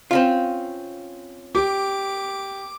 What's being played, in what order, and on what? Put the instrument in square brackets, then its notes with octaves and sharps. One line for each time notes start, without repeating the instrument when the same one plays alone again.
[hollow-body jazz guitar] C4 C#4 F4
[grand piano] G4 [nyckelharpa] D6